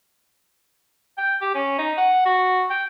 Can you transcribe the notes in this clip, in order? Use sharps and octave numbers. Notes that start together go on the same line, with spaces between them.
G5
G4
C#4
D#4
F#5
F#4
G5